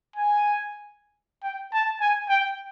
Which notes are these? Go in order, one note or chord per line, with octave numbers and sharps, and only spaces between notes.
G#5
G5
A5
G#5
G5